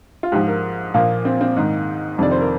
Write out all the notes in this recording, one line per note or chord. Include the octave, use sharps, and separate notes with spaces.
F4
G#2 F3 G4
A#4
A#2 F3 A#3
C4
C4
G#2 D#3 D#4
F2 C3 D#3 D5
C5
A#4